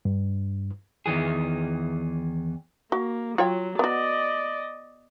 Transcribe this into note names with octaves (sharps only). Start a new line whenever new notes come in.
G2
E2 D#3 E3 G#4
A#3 F#4
F#3 F4 C#5 G5
B3 F#4 D5 D#5